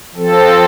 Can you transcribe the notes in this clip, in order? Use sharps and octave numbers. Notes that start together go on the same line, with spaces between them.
F3 C4 A4